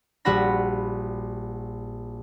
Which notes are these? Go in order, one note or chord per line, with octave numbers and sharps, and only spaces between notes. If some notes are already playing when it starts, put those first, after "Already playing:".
A#1 G3 F#4 F#5 B5 A#6